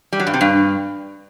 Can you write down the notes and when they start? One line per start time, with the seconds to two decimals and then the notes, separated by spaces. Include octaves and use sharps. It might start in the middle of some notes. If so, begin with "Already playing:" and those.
0.13 G3
0.20 F#3
0.27 G2
0.34 C3
0.41 G2